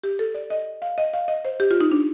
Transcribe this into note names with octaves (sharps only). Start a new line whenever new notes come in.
G4
A4
D5
D#5
F5
D#5
F5
D#5
C5
G4
F4
D#4
D4